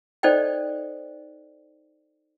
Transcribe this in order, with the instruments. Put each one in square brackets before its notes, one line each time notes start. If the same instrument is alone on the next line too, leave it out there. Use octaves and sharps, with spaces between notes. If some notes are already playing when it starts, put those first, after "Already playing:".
[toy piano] D#4 A4 C5 D5 D#5 G5